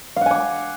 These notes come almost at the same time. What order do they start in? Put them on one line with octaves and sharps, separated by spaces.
F5 F#5 G#5 D6